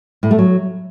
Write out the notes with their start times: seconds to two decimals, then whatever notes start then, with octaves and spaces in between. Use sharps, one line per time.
0.23 A2
0.31 A3
0.39 F#3